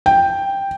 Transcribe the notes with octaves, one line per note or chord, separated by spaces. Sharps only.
G5